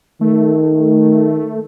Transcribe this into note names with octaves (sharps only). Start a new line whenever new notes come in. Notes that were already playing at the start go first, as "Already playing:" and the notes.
D#3 A3